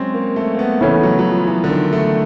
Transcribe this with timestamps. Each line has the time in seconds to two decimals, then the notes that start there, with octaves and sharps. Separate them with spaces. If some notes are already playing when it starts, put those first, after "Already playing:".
Already playing: F#3 G#3 C4 C#4
0.14 A#3
0.36 A3
0.55 A#3
0.59 B3
0.81 C#3 E3 A3 B3 C#4
1.03 F#3
1.19 F#3
1.25 F3
1.47 E3
1.64 D3
1.70 D#3
1.93 A3